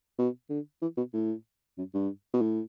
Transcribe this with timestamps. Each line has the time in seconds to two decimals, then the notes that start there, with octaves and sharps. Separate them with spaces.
0.19 B2
0.50 D3
0.82 E3
0.97 B2
1.13 A2
1.78 F#2
1.94 G2
2.34 B2
2.41 A2